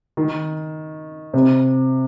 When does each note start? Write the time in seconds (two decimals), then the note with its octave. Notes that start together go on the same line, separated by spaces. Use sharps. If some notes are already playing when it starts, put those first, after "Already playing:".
0.17 D#3
1.34 C3